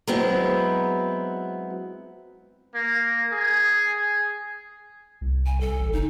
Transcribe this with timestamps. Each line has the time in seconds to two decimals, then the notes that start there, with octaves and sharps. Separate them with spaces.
0.07 F#3 G#3 B3 C4 E4
2.75 A#3
3.32 G#4
5.21 C2
5.46 G#5
5.60 A4
5.79 A1
5.93 F#1 D#4